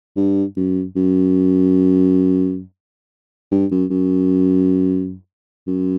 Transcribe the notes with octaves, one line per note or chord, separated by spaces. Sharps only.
G2
F#2
F#2
G2
F#2
F#2
F#2